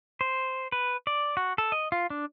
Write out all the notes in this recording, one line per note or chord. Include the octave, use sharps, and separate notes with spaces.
C5
B4
D5
F#4
A4
D#5
F4
D4